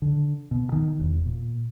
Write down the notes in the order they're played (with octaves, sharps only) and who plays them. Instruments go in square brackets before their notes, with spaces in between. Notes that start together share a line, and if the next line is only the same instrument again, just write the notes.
[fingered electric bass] D3
B2
D#3
E1
A#2